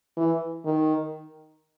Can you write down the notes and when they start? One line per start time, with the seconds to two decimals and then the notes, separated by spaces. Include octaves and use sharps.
0.17 E3
0.65 D#3